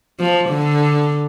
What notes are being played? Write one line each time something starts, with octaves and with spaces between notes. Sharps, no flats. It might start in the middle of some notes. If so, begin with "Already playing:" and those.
F3
D3